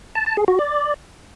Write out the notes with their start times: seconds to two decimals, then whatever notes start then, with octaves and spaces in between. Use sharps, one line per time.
0.15 A5
0.26 A5
0.37 G#4
0.48 F#4
0.59 D5